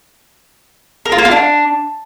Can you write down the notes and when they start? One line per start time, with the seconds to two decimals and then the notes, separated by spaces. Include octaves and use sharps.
1.05 A#4
1.12 F4
1.18 A#3
1.25 F4
1.31 D4